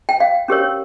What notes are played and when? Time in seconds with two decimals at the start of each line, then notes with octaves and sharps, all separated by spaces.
0.09 G5
0.20 F5
0.48 C#4 G4 A#4 C#5